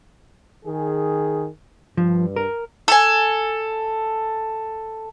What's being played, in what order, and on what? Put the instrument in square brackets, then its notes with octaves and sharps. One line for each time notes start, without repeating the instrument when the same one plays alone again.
[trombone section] D#3 G#4
[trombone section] G2 [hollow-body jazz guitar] F3
[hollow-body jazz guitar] A#4
[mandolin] A4 G#5